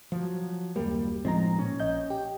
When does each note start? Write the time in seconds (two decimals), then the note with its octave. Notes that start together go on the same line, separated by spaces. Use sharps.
0.12 F3 F#3
0.76 F#1 D#2 G3 A#3
1.25 A2 F3 G#3 C4 D#4 A#5
1.59 A#2 C#4
1.80 A#1 D#5 G6
2.10 G4